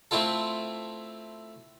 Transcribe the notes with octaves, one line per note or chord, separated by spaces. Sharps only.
A3 C4 E4 F4 A4